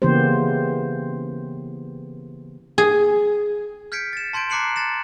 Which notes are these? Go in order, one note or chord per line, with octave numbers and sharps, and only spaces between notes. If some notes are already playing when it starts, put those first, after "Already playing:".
C#3 E3 A#3 B3 G4 C5
G#4
F6 G6 G#6 B6 C#7 D7
A6 E7
A5 C6 G6 G#6 D7
A#5 D6 F#6 C7 C#7 F#7
A6 A#6 E7